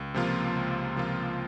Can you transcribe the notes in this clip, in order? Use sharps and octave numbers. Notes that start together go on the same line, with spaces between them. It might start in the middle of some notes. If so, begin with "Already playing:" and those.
Already playing: C#2
C3 F3 A#3 F4
C#2
C3 F3 A#3 F4